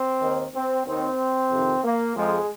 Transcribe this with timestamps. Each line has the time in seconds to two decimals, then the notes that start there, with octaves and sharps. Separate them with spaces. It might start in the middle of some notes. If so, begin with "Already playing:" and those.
Already playing: C4
0.21 D#2 D#3
0.54 C4
0.85 D#2 D#3 C4
1.50 F2 C3 D#3
1.83 A#3
2.14 F2 F3 G#3